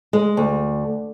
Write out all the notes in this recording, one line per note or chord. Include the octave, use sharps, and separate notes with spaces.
G#3
D2